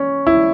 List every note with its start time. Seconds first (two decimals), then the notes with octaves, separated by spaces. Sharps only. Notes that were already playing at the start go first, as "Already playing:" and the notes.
Already playing: C#4
0.27 E4